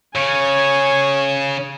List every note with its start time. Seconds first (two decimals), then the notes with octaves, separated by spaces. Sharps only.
0.15 C#3 C#5 G#5